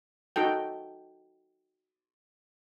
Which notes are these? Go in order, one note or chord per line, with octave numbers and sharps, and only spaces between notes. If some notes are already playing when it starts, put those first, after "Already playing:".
D#4 F#4 A4 G5